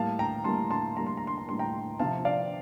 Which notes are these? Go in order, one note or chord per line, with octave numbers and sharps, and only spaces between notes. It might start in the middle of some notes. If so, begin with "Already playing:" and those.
Already playing: A2 G3 A#3 F5 A5
G5 A#5
A2 G3 A#3 A5 C6
A5 C6
A2 G3 A#3 A#5
C6
A#5
C6
A#5
A2 G3 A#3 C6
G5 A#5
C3 F3 C4 F5 A5
D5 F5